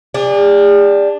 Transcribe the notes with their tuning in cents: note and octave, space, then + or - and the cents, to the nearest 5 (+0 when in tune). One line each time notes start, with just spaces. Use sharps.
D4 +0 G#4 -45